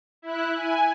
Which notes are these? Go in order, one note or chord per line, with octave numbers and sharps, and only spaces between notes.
E4 F#6
G#5